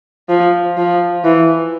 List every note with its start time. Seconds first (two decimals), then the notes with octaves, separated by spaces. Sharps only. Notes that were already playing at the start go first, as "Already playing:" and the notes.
0.29 F3
0.77 F3
1.24 E3